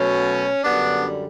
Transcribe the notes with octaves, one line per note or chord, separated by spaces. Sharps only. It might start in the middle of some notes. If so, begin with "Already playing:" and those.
Already playing: B2 F#3 A3 C#4
F#2 D3 G3 B3 D4